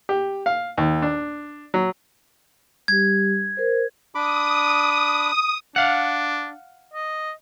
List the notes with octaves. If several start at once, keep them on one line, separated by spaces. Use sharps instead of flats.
G4
F5
D#2
D4
F#3
G3 G4 G#6
A#4 C5
D4 B5 D6 D#6
D4 F5 F#5
D#5